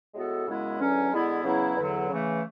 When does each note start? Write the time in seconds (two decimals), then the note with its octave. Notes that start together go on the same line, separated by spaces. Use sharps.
0.14 A2 G#3 B3 F#4 A4
0.46 F#2 C#3 G#3 B3 E4
0.79 E2 D3 F#3 C#4
1.12 D3 G#3 B3 E4
1.44 E2 C#3 F#3 B3 E4
1.77 E2 D3 F#3
2.09 C#3 E3 A3